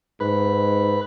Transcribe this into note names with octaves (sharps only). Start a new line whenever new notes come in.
G#2 B4